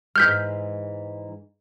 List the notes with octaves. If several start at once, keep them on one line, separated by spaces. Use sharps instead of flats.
G#2 E3 G#3 F6 G6 B6